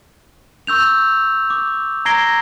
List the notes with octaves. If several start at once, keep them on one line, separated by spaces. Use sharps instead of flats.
C#6 E6 G6 F7
D6
A#5 G#6 A#6 C7 D7 G7